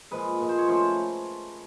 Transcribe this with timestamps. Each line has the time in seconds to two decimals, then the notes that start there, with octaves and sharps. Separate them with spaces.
0.11 A#2 F3 G#3 B4
0.40 A#2 F3 G#3
0.49 C5
0.58 C#5
0.68 C#3 F3 A3 C5